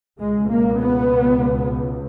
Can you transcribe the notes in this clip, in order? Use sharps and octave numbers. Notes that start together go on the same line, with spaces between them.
C#2 B2 G#3
A#3
B3